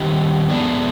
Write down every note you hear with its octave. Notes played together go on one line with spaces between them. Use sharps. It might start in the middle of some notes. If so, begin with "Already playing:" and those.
Already playing: D#3 G3 C4 D#4 G4
D3 F3 G#3 B3 D4